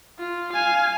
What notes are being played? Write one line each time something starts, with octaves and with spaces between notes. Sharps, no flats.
F4
F5 G#5